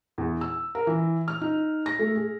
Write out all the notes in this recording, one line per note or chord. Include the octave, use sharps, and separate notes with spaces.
E2
E6
A#4
E3
F6
D#4
A#6
A3
G#4